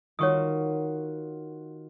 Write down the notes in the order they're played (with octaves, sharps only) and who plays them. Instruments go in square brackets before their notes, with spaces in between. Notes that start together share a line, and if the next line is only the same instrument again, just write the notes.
[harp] D#3 F4 F#4 [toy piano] C#5 C#6 D#6